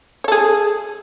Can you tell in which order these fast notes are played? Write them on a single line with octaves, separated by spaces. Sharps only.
C#5 A4 G#4